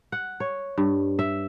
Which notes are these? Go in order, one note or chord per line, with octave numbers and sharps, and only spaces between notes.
F#5
C#5
G2
E5